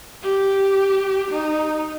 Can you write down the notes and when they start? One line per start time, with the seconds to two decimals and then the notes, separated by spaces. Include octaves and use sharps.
0.22 G4
1.30 D#4